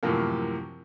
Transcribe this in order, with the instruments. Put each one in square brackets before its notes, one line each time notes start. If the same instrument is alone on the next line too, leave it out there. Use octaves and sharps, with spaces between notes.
[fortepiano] F#2 A2 C3 E3 F3 A#3